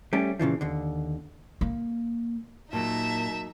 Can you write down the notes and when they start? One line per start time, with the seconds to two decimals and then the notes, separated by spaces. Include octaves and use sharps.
0.13 G3 A3 C#4 G4
0.39 A#2 C#3 E3 F3
0.61 D#2 D3
1.61 A#3
2.73 A#2 F#3 A#3 D#4 E5 A5